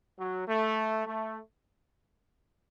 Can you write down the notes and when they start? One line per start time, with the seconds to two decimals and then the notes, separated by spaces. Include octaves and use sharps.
0.18 F#3
0.48 A3
1.06 A3